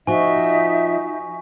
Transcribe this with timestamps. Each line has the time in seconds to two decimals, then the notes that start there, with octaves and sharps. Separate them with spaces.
0.07 F3 D#4 F#4 E5 G#5 C#6